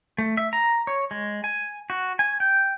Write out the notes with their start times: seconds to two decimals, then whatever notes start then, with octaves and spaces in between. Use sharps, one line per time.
0.18 A3
0.37 E5
0.53 A#5
0.87 C#5
1.11 G#3
1.44 G#5
1.90 F#4
2.19 G#5
2.40 G5